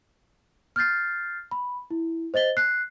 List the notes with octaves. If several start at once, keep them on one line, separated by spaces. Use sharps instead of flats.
F6 G6 A6 C7
B5
E4
C5 D#5 A6 G7
F#6 C7